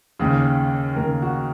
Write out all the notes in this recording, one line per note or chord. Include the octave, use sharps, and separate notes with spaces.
D#2 C#3
D#2 C#3 A#4
F#4